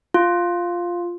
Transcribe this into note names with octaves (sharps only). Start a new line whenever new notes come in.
F4